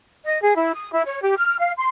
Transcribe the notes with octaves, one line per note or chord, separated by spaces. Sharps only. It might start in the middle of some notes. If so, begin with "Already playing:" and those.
D#5
G#4
E4
D#6
E4
C#5
G4
F6
F5
C6